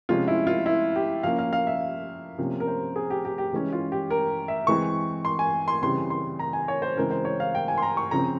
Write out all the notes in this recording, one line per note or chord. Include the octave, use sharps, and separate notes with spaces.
C3 F3 G#3 C#4 F4
E4
F4
E4
G4
F3 A#3 C#4 F5
F5
F5
E5
C3 F3 A#3 C#4
A#4
C5
G#4
G4
G4
G4
E3 G#3 C#4
F4
G4
A#4
E5
E3 G#3 C4 C#6
C6
G#5
C6
C#3 E3 G3 C4 C6
C6
A#5
G#5
C#5
C5
C#3 E3 G#3 C4 A#4
C5
C#5
F5
G5
G#5
C6
A#5
C#6
C#3 F3 C4 A#5